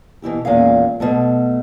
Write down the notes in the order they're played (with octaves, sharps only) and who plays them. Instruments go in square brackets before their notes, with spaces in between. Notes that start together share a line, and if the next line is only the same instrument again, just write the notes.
[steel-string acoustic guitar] B2 E3 E4 G4
E2 A#2 G#3 C#4 F5
B2 F#3 A3